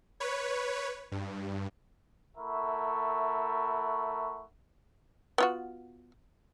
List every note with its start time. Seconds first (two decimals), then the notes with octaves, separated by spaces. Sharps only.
0.20 B4 C#5
1.12 G2
2.37 A3 E4 A#4 E5 F#5 C#6
5.38 B3 F4 F#4